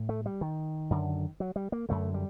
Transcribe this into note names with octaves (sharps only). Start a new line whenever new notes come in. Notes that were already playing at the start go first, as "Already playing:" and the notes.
Already playing: A2
A3
G3
D#3
F#2 D3
F#3
G3
A#3
F#2 D3 A3
G3